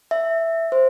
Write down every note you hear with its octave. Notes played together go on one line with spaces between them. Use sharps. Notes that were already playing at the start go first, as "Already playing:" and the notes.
E5
C5